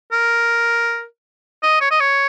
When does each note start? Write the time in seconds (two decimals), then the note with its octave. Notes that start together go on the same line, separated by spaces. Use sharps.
0.12 A#4
1.63 D#5
1.81 C#5
1.91 D#5
2.00 C#5